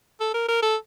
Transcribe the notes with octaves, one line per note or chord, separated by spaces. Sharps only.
A4
A#4
A#4
A4